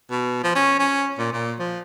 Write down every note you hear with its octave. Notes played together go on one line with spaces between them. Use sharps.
B2
F3
C#4
C#4
A#2
A#2
F3